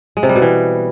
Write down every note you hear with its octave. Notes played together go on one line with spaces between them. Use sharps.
G#3
C3
G3
B2
E3